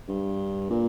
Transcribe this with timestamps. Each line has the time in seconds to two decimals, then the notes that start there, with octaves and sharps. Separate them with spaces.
0.08 G2
0.70 A#2